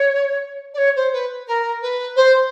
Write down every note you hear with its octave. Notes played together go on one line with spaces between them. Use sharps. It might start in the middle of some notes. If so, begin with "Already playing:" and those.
Already playing: C#5
D5
C#5
C5
B4
A#4
B4
C5